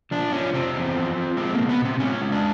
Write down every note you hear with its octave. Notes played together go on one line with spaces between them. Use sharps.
F3 D4
F3 C#4
C3 C4
E2
F3
F3
G#3 C4
A#3
B2
B3
B2
C4
G#3 C#4
G#3
D4